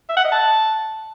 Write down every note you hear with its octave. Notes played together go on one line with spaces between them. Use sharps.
E5
F#5
D#5
A5